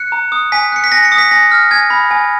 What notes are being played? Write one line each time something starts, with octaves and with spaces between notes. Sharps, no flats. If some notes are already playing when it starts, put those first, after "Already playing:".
Already playing: F#6 C#7
A#5
D#6
G#5 B6
F#6 C#7
B6
G#5 A#6
C#7
D#6
B6
G#5 A#6
F6
G#5 G#6
B5
G#5